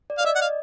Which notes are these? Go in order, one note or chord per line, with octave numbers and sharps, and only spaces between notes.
D5
F5
D5
D#5 E5
F#5
F5